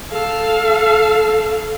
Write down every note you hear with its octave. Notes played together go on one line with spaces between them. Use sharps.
A4 F5